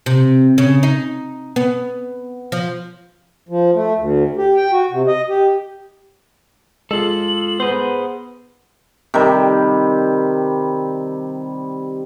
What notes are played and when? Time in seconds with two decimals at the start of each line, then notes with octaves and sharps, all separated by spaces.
0.06 C3
0.58 C#3
0.83 D#4
1.56 B3
2.52 F3
3.49 F3
3.74 A3
3.98 D2
4.37 G4
4.56 G5
4.72 F#4
4.91 C3
5.07 D#5
5.28 G4
6.91 G#3 F4 A4 F#7
7.60 B3 G#4 C5
9.14 C3 D#3 G3